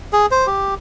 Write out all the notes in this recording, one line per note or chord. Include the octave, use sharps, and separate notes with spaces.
G#4
C5
G4